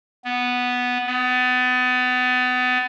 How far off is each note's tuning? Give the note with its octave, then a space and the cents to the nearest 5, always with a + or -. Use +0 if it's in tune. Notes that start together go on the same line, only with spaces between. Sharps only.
B3 +0
B3 +30